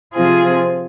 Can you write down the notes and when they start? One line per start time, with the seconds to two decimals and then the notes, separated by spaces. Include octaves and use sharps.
0.14 C3 F3 C4 F4 G#4